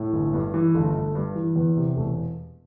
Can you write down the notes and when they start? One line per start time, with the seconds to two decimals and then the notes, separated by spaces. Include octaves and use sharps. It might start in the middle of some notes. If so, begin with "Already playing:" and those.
Already playing: A2
0.13 G1
0.34 G2
0.54 E3
0.74 G1 A3
0.94 G1
1.15 G2
1.35 E3
1.56 E2
1.77 C3
1.96 E1 A3